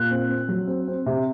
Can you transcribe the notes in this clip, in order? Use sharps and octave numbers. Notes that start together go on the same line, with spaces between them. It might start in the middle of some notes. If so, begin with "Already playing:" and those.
Already playing: A#2 F#6
C4
C4
F#3
C4
C4
C3